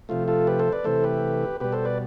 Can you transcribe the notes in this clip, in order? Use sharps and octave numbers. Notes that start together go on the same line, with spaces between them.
C3 F3 A3 F4
F4 A4
G4 B4
A4 C5
B4 D5
C3 E3 A3 A4 C5
G4 B4
B2 G3 G4 B4
A4 C5
B4 D5